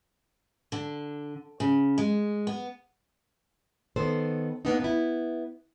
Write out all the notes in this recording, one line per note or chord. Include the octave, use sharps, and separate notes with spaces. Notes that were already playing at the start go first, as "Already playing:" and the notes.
D3
C#3
G#3
B3
D#3 B3 A4 C5
A#3 B3 D4 D#4
B3 E4